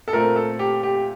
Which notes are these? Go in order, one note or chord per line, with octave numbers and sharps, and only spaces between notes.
A4
A#2 A3 C4 A#4
A4
G4
G4